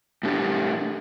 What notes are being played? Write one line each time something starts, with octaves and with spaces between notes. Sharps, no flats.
A2 A3 D4 G4